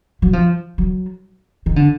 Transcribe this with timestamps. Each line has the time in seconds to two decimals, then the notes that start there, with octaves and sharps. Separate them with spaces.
0.22 F#3
0.33 F3
0.78 F#3
1.66 D#3
1.76 D3